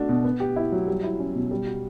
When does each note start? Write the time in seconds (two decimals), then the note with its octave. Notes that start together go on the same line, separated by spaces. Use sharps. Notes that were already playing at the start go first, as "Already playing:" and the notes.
Already playing: A3 D4 F#4
0.09 B2
0.24 B3
0.40 G4
0.56 E4
0.72 F#3
0.88 G3
1.03 E4
1.19 C#4
1.35 B2
1.51 G3
1.66 F#4